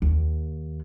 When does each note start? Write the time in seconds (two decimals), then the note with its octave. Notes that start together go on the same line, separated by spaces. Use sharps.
0.02 D#2